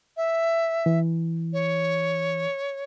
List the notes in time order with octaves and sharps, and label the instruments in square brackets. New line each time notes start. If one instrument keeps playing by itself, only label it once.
[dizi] E5
[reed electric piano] E3
[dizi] C#5